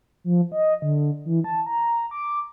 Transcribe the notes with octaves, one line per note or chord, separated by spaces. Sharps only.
F3
D#5
D3
E3
A5
A#5
D6